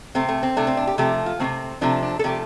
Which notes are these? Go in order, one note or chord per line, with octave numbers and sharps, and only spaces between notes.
C3 A3 C4
A3
C4
C3 A3 D4
C4
D4
G4
C3 F3 A3 G4
F4
C3 F3 A3 C4
C3 F3 A3 D4
D4
A4
C3 F3 A3 G4